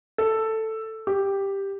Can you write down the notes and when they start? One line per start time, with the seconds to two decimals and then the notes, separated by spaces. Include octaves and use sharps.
0.18 A4
1.07 G4